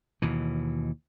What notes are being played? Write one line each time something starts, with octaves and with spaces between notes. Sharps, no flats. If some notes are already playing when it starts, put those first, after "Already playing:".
D#2 B2 E3